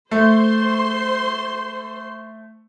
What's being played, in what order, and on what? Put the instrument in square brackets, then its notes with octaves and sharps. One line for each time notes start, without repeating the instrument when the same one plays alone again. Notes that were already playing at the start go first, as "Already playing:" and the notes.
[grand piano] A3 [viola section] C5 C6